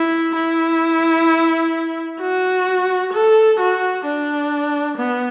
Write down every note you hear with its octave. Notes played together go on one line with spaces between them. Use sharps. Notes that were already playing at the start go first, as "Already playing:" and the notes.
Already playing: E4
E4
F#4
A4
F#4
D4
B3